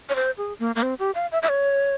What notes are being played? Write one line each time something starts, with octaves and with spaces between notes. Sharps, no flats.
C#5
C5
G#4
A#3
A#3
C4
G4
F5
E5
E5
C#5